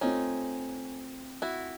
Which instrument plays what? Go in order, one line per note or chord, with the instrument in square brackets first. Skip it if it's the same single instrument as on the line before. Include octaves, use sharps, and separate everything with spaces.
[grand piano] A3 C4 F4 [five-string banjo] C#4 D#4
[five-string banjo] E4 F#4